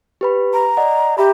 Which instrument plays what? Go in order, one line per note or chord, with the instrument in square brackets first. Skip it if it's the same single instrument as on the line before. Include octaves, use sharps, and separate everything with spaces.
[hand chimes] G4 B4 B5
[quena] A#5
[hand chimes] D5 D#5 F#5
[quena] G4 [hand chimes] E5 A#5 B5